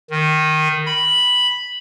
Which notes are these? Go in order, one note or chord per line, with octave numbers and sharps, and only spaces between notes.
D#3
B5